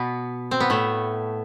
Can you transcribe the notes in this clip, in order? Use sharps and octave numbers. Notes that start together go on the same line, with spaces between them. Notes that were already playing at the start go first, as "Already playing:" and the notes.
Already playing: B2 B3
C4
B3
A2 A3